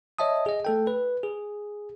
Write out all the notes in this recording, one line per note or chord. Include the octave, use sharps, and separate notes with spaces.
C#5 D#5 E5 A5 D#6
G#4 D#5
A3 A4 G5
B4
G#4